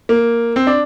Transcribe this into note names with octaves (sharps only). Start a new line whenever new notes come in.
A#3
C4
D4